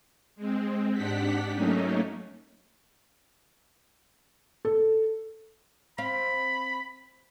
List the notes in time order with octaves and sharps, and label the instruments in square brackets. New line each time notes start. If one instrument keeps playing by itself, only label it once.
[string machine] G#3 C4
G#2 D4 G4 F#5 B6
F#3 A3 A#3 C#4 D#4
[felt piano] A4
[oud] C4 F5 [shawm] B5